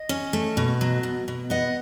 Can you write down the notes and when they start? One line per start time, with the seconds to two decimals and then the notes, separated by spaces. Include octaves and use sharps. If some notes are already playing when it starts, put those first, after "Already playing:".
Already playing: D#5
0.09 C#4
0.33 A3
0.57 B2
0.81 F#3
1.03 B2
1.28 B2
1.50 B3 D#5 F#5